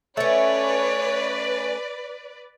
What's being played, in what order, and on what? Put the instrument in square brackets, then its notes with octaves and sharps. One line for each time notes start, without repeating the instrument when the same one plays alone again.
[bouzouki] A3 C#4 [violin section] B4 D5 [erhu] C#5